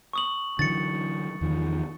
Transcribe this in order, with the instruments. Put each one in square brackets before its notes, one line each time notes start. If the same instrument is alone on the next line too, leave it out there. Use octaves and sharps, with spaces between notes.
[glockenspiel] C#6 D#6 F#7
[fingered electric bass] D3 E3 F#3 [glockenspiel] A6 C#7
[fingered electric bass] E2 D#3 F3